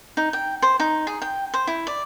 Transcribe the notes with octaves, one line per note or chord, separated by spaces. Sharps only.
D#4
G5
C5
D#4
G#4
G5
C5
E4
D5